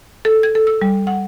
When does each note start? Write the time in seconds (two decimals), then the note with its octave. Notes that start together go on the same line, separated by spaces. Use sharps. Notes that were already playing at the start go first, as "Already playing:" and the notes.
0.25 A4
0.43 G#6
0.55 A4
0.67 E6
0.81 G3
1.07 F#5